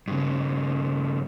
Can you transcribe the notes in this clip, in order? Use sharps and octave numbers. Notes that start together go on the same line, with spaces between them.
G2 C#3